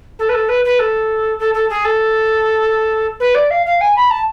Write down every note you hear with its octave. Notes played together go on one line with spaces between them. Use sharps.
A4
B4
A4
B4
B4
A4
A4
A4
G#4
A4
B4
D5
F5
F5
G#5
B5
A5